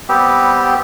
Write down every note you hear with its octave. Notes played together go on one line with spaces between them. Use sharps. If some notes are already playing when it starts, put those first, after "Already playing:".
G3 B3 C4 G4